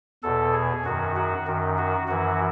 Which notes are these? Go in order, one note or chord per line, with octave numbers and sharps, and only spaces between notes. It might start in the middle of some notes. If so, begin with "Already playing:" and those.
E2 B2 A4
G#4
F#2 D#3 F#4
F#4
F#2 D#3
F#4
F#2 E3 F#4